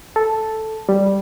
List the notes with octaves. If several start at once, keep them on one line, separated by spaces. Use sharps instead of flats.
A4
G3